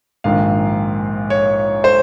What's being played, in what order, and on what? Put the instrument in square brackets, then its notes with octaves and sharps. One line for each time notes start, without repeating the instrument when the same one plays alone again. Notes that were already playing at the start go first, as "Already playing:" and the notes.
[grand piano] A#1 G#2 D#3 F5
C#5
C5